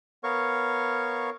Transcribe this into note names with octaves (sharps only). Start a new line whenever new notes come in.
B3 A#4 C#5 F5 C#6